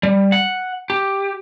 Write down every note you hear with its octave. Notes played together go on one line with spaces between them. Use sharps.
G3
F#5
G4